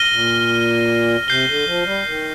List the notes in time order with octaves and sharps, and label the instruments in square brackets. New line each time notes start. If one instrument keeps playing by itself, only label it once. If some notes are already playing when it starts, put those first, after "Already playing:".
Already playing: [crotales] F6 A#6 D#7 G7
[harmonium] A#2
[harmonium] C3 [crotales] G6 C7 G7
[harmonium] D3
F3
G3
D#3